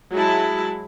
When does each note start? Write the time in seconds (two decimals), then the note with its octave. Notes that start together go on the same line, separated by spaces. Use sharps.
0.12 F#3 G#3 E4 A5